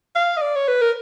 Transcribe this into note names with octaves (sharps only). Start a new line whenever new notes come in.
F5
D#5
D5
C#5
B4
A#4